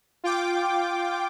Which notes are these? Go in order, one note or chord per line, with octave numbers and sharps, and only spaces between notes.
F4 G5 D6